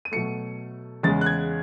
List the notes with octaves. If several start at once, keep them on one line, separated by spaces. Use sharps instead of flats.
D#7
B2 F#3 A3 C#7
E2 C#3 G#3 A6
F#6
G#6